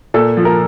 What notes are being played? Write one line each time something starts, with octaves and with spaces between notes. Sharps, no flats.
A#2 A4
F3
A#4